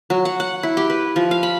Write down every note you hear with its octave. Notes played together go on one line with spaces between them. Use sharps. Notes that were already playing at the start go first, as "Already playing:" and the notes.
F#3
F#5
F#5
E4
G4
B4
F3
F5
B5